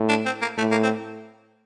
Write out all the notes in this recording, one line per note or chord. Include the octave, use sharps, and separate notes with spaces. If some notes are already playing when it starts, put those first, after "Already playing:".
Already playing: A2
D4
C4
A#3
A2 A3
A#3
C4